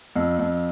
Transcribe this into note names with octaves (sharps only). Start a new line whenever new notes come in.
F2
F2